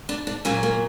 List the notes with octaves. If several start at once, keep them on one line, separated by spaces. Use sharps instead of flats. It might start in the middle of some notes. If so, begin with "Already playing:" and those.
D4
D4
A#2 F#3 A#3 C#4
A#3